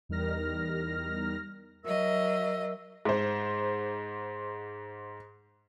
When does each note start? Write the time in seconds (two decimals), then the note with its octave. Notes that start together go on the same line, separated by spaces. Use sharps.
0.09 E2 G3 D#4 A#4 F6 A#6
1.84 F#3 A#4 D#5 E5 E6
3.05 G#2 C5